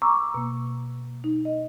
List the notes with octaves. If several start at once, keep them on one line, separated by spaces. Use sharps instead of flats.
A#5 C#6 D6 E6
B2 A#3
D#4
D#5